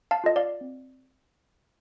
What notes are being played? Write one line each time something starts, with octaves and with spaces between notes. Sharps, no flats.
F5 A5
F4 A4 D#5
D5 F5
C4